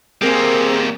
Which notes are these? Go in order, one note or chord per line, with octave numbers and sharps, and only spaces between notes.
G3 A#3 C4 G#4 A#4